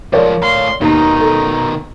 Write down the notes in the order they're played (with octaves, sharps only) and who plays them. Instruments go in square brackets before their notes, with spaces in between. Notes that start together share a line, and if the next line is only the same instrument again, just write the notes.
[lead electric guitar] F3 G#3 [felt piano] A#4 C#5 D5
[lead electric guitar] A2 F5 [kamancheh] C6
[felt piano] D#2 [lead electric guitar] B2 D#3 [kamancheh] D#4
[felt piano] A4